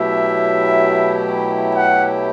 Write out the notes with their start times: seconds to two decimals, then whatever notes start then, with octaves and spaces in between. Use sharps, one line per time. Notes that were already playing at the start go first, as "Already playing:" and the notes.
Already playing: B2 F#3 A3 E4 G4 E5
1.75 F#5